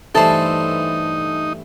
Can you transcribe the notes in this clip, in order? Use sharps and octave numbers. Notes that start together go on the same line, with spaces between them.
G2 E3 A3 D#4 A4 C5